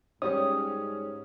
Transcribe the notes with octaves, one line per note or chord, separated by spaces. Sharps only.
G#2 G3 C#4 G4 C#5 D#6